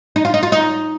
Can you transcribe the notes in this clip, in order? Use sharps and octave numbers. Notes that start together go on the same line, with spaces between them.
D#4
F4
D#4
F4
D#4